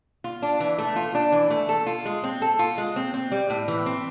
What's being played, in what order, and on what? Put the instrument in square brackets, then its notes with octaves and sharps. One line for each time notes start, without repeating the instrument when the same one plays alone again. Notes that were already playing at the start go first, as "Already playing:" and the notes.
[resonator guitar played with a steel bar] F4
D4
E3
A3
F4
D4
E3
A3
A4
F4
G#3
C4
A4
F4
G#3
C4
C4
G3
A2
E3
C4